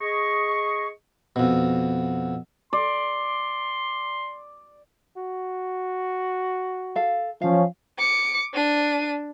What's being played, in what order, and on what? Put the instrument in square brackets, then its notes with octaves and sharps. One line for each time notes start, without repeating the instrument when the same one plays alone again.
[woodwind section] G#4 D#5 C#6
[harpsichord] F2 B2
[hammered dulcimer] D5 [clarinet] C6
[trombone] F#4
[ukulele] A4 F5
[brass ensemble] F3 C#4 [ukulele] F5
[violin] D6 C#7
D4 D#7